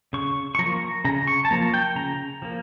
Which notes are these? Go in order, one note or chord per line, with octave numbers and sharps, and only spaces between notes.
C#3 C#6
C#6
F3 A#3 A#5
C#3 A#5
C#6
A5
F3 A#3 A#5
G5
C#3 A#5
F3 A#3